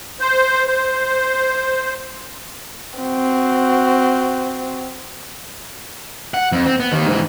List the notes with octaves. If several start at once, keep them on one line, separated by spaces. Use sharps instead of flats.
C5
C5
C4 F#4
F#5
F2
C4
B3
D#2 D#3
G#2 E3